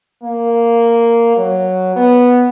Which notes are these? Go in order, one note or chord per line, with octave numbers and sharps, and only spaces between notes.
A#3
F#3
B3